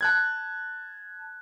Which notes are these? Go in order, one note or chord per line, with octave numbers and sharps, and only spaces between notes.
A5 F#6 G#6